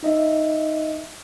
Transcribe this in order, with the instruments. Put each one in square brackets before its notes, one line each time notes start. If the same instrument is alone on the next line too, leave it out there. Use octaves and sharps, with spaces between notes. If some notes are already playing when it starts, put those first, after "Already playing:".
[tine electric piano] D#4 D#5 E5